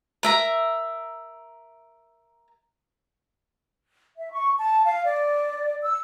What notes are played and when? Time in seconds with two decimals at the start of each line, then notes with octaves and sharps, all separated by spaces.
0.23 A#4 E5 A#5
4.17 E5
4.32 C#6
4.57 A5
4.84 F5
5.05 D5
5.83 E6